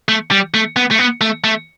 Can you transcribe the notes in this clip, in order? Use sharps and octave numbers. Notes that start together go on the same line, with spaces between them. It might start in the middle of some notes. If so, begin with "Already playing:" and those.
A3
G3
A3
B3
A3
B3
A3
A3